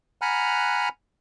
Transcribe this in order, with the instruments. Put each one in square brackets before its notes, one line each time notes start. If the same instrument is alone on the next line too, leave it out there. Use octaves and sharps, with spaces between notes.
[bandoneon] F#5 G#5 A#5 B5 F6 F#6